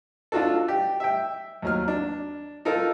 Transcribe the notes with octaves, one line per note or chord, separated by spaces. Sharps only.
D4 F4 F#4 A4
G4
E5 G5
D#2 F#3 F6
D4
D#4 F4 A4 A#4